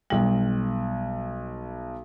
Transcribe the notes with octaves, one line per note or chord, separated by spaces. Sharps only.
B1 G3 F#7